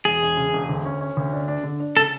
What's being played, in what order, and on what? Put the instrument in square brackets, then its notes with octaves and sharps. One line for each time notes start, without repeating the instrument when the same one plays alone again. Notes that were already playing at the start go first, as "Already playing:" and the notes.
[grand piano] E1 [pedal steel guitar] G#4
[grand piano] E1
C#3
E1
D2
C#4
C#4
D2
D4
D4
D3
D4
[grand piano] C#3 [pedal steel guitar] A4